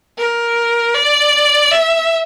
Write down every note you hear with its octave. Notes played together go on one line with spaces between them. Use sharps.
A#4
D5
E5